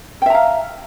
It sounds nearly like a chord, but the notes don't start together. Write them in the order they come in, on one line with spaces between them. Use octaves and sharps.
G5 E5 A#5 F5